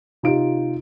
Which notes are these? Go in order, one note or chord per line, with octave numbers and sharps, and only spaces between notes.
C3 D#4 F4 D7